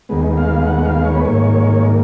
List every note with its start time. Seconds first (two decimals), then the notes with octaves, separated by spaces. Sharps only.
0.09 D#2 D#3 G#3 B3
0.37 F5
0.67 F#5
0.85 F5
1.05 C#5
1.15 B4
1.25 G#2 D#3 A#3 C#5